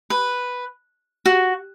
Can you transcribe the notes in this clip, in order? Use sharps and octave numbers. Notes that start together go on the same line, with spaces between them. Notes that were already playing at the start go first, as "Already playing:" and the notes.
B4
F#4